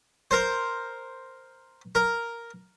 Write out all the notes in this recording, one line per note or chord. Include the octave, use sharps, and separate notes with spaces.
A#4 C5
A#4